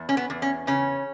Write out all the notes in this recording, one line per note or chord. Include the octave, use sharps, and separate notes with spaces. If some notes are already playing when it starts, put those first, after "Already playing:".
Already playing: E2
C#4
B3
E2
C#4
C#3 C#4